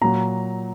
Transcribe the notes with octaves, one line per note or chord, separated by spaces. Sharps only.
A#2 F#3 A#5